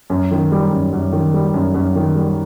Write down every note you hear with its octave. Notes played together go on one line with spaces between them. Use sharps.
F#2
D#3
G3
F#2
F#2
D#3
G3
F#2
F#2
D#3
G3